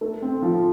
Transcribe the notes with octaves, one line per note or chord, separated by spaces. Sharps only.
A3
C4
F3